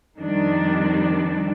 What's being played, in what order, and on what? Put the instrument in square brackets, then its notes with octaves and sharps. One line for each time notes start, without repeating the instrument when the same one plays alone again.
[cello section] F2 D#3 G3 D4